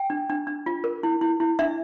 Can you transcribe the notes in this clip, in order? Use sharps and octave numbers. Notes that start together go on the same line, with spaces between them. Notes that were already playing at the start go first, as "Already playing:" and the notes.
Already playing: G5
D4
D4
D4
F4
A#4
E4
E4
E4
D4 E5